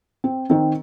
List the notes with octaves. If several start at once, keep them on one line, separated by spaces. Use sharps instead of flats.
C4
D#3 C4